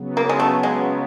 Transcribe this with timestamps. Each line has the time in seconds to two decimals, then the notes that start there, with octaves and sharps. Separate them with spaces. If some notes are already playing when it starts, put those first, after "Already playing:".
Already playing: C#3 F#3 B3
0.17 A#3
0.29 G#3
0.39 A3
0.63 G#3